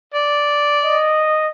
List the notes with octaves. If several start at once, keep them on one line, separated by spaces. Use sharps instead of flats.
D5
D#5